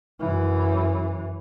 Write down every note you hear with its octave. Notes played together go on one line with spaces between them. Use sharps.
F#2 E3